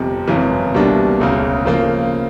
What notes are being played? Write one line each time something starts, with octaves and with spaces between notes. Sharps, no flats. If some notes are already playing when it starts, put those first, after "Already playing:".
Already playing: G1 F2 C3
G#1 F#2 C#3 E3
C2 B2 G3 A#3 D4
E1 D2 C#3
C#3 F3 A#3